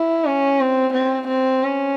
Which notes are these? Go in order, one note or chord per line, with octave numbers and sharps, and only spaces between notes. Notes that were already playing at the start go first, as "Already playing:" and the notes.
Already playing: E4
C#4
C4
C4
C4
C#4